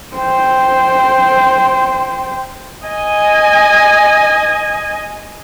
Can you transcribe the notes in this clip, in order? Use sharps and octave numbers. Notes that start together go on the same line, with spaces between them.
C5 G5
D#5 G#5